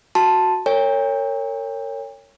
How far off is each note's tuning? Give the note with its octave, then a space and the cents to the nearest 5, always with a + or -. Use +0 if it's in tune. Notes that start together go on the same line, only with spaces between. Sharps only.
F#4 +0 A5 +0 C6 +0
A#4 -35 C#5 +0 G5 +40